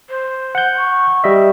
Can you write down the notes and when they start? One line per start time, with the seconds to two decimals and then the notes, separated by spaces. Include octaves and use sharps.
0.09 C5
0.55 F#5 G6
0.78 C#6
1.24 G3 D#5 E5